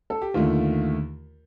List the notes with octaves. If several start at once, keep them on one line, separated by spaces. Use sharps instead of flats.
A4
G4
D#2 D3 A3 F4